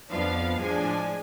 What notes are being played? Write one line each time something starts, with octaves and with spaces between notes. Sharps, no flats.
F2 F3 B3 D4 F5
A2 F3 G#3 D4 G#5